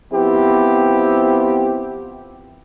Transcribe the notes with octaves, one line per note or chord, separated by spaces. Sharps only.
F3 B3 C4 E4 G4